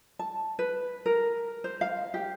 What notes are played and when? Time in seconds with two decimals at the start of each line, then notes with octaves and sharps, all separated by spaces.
0.19 A5
0.59 B4
1.06 A#4
1.64 C5
1.81 F5
2.14 G4